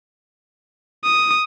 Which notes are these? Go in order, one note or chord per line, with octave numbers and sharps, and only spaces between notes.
D#6